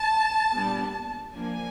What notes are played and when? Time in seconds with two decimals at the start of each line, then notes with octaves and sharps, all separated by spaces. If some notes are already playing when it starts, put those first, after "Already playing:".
Already playing: A5
0.55 A#2 G3 B3 D4
1.35 F3 A#3 D4 G#5